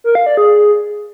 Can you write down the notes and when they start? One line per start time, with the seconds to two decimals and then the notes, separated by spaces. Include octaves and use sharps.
0.04 A#4
0.15 F5
0.26 D5
0.37 G#4